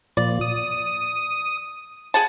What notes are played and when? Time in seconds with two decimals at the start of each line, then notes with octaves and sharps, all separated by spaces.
0.17 A#2 F3 D5
0.41 D#6
2.14 G#4 F#5 A5